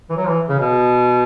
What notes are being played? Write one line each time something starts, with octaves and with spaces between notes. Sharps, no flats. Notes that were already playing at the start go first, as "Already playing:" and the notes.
E3
F#3
E3
C#3
B2